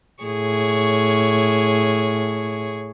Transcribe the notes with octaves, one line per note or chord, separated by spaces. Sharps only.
A2 G#4 C#5